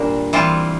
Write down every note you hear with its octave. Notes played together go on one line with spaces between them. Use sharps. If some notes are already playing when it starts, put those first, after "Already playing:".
Already playing: A#2 G3 A#3 D4
E3 G3 C4 F4